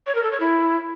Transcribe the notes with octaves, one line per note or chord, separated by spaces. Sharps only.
C#5
A#4
A4
C#5
E4